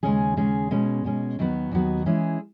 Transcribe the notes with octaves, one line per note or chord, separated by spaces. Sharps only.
D#2 C#3 G#3 C#4 G#4
D#2 C#3 G#3 C#4 G#4
B2 G#3 C#4
B2 G#3 C#4
D#2 D#3 F#3 B3 F#4
D#2 D#3 F#3 B3 F#4
E3 G#3 C#4 E4 G#4